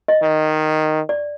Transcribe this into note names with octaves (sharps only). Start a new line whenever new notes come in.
D#5
D#3
D5